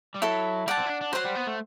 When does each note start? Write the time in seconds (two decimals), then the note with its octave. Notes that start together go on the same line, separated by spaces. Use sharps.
0.14 G3
0.21 F#3 E4 A4 E5
0.67 G3 D5 F#5 A5
0.78 C4
0.86 E4
0.90 D4
1.01 D4
1.12 F#3 C5 F#5 C6
1.24 G3
1.35 B3
1.47 A3